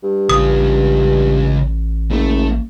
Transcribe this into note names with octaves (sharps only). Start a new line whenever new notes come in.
G2
A1 C#3 F4 D#6
F#1 A3